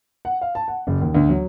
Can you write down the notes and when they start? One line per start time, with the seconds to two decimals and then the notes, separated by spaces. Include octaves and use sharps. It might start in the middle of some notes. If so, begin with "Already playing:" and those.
0.25 F#5
0.41 F5
0.55 A5
0.68 F#5
0.87 F#1
1.01 D#2
1.15 D2
1.29 F#3